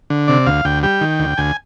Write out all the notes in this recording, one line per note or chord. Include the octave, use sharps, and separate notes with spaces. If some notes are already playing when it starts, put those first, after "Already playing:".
D3
C3 D5
D2 F5
D2 G5
G3 G5
D#3
D2
D2 G#5